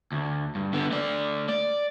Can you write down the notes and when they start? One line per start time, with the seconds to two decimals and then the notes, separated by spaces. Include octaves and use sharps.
0.12 D2
0.55 G2
0.73 D3 B3
0.91 A3 D5
1.48 D5